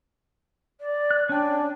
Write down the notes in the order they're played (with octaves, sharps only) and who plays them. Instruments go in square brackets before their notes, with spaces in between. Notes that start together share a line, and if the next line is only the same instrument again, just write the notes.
[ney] D5
[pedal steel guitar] F#6
[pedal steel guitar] C#4 G5 [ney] D4